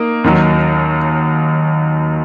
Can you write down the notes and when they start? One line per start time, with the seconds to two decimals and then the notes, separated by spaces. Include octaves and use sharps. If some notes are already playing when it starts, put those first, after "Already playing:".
Already playing: A#3 D#4
0.24 D#2 D#3 F#3